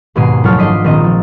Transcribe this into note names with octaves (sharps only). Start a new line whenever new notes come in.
D#2 G#2 B2 G#4 D#6 C7
F#1 F3 A3 A4 C#5 F6
G#2 D4 D#5 B6 C7
A#1 D#3 C4 D#5
F3